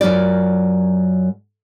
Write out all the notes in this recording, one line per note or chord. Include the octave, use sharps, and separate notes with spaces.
F#2 F#3 F4 D5